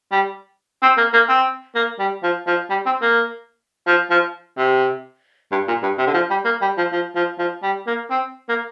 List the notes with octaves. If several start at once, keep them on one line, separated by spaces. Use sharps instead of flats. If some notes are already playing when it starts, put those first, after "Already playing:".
G3
C4
A#3
A#3
C4
A#3
G3
F3
F3
G3
C4
A#3
F3
F3
C3
G2
A#2
G2
C3
D3
F3
G3
A#3
G3
F3
F3
F3
F3
G3
A#3
C4
A#3